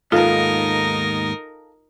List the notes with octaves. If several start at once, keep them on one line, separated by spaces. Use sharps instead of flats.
D#2 G#2 B3 D#4 F4 A4 A#4 F5